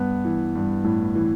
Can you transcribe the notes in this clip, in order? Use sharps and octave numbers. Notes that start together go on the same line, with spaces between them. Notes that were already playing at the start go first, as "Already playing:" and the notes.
Already playing: G2 B3
E3
G2
A2
E3